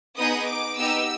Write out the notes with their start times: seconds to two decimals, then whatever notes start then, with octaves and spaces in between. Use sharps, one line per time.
0.17 B3 D#4 G#4 D#6
0.47 D6
0.78 B3 D#4 G4 E6